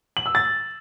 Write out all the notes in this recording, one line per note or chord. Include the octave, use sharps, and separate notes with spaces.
F#7
E6
A6